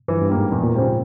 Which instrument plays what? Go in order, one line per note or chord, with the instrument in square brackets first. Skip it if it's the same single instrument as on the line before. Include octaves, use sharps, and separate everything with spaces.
[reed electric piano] G2 [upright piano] E3
[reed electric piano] G2
[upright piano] G3 A#3
[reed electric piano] G#2
[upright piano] E2 [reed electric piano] A#2
[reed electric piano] A#2
[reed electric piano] G#2 [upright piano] C#3 F3 C4 G4